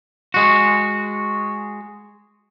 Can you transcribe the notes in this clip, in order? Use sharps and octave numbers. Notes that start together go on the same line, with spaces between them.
G#3 F#4